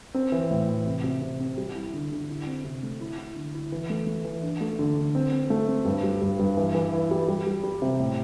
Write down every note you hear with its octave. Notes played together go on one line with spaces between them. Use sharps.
C4
E3
A2
E3
C3
C3
C3
C4
G3
E4
D3
D3
E4
C4
C3
A3
E4
E4
D3
E4
E3
A3
A3
E3
D4
A3
D3
D3
C4
C4
A3
C4
G2
G3
G2
G2
E3
E3
E4
G3
G3
G3
G3
C3
A2